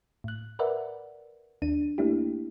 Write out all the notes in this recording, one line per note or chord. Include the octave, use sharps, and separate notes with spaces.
A2 F#6
A#4 B4 D5 E5 F#5
D#2 D4 D#7
A3 A#3 D4 E4 G4